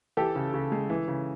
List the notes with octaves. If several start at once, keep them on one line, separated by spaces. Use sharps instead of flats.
E3 G4 A4
C#3
C#3
G#3
E3
C#3